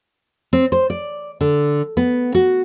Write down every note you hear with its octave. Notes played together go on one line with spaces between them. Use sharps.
C4
C5
D5
D3
B3
F#4